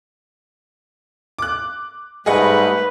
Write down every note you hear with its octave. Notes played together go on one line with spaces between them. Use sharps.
D6 F#6
G#2 G3 A3 G#4 B4 D#5 F#5